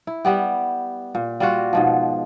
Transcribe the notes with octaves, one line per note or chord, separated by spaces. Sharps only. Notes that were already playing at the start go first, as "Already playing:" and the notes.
E4
G3 B3 G4
A#2
G3 F4 F#4
G#2 B2 F3